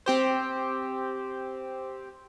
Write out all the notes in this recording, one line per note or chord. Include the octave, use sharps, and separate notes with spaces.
C4 G4 C5